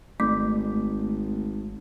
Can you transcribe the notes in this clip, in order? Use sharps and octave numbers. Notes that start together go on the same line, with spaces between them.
G#1 A3